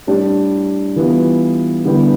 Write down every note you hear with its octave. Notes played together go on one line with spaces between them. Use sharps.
A2 G3 D4 G4
E3 G3 B3 F4
D3 G3 B3 E4 G4